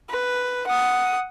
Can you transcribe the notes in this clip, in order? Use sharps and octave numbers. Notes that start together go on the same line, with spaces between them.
B4
F#5 D#6